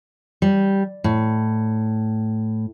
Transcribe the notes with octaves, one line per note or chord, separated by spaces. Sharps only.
G3
A2